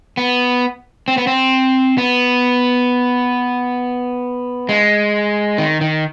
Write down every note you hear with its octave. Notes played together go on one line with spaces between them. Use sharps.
B3
C4
B3
C4
B3
G#3
D#3
D#3